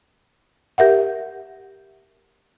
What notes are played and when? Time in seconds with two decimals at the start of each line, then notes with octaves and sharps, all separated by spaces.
0.78 G4 A#4 E5 F#5